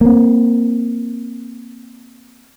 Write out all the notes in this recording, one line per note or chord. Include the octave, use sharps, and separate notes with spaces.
A#3 C4